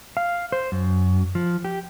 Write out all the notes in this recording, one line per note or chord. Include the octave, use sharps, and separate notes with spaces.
F5
C5
F#2
F3
G4